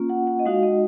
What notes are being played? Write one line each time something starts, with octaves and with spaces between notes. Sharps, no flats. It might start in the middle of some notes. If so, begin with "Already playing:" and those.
Already playing: A#3 C#4 F4
F#5
F#5
D#5
G#3 D#4 F#4 F5
D#5